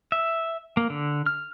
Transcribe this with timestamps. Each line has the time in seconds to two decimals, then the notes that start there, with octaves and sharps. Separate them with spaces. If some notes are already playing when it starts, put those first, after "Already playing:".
0.12 E5
0.77 A#3
0.90 D3
1.26 F6